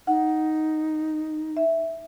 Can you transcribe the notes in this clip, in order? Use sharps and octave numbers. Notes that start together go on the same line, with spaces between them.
D#4 F#5
E5